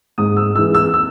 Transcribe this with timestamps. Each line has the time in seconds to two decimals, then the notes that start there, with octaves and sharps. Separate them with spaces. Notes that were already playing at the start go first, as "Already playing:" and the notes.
0.18 G#2 D#6
0.37 E6
0.55 E3 G#3 E6
0.74 E6
0.94 E6